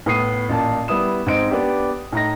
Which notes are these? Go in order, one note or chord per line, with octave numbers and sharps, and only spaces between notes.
A2 B3 D#6 C7 D#7
A1 A#2 A5
G3 B3 E4 D#6 E7
G#2 C4 D#5 D7
B3 D4 G4
A2 D#4 A#6